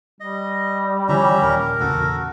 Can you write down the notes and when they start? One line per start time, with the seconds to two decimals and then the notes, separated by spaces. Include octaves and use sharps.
0.20 G3 D#5
1.09 D3 E3 F3 C#4 G4 E5 A#5
1.42 D#1 A#4
1.80 A#1 E2 C#3 F#4 A4